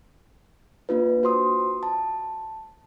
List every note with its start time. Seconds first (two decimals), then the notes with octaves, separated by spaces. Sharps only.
0.89 A#3 D4 F4 B4
1.23 F#4 C5 C6 D#6
1.83 A5